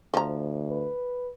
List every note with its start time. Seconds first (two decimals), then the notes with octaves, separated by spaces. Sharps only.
0.14 D2 F3 A#5
0.70 B4